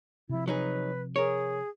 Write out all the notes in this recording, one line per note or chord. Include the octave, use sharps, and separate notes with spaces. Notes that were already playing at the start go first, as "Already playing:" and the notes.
C3 F3 E4
F#3 D#4 G#4 B4
G#4 A#4 C#5